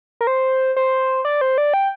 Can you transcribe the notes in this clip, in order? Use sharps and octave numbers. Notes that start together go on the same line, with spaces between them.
A#4
C5
C5
D5
C5
D5
G5